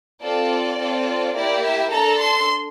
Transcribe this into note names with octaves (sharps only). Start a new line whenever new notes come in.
C4 F4 A4 D5
C4 F4 A4
A#3 E4 G4 D5
E5
D4 A4 A#5
C6